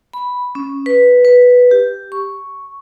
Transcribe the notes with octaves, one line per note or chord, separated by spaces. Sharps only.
B5
C#4
B4
B4
G4
C#6